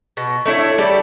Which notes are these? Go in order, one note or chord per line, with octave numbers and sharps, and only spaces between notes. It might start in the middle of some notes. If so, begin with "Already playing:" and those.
B2
A3 D4 E4 C#5
G3 G4 A4 D5